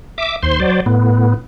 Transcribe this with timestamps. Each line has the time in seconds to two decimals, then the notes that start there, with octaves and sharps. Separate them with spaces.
0.18 E5 D6
0.43 D#2 C5 C6
0.60 F#3 C5 D5
0.86 A2 B3